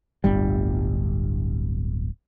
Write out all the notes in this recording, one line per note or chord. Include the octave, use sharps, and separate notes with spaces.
D1 G1 G3